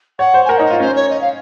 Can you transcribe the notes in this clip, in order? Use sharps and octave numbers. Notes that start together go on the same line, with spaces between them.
C#5 F#5
C5
G#5
A#4 F#5
D#4 C#5
D#5
F4
C#4 C5
C#5
D#5
F5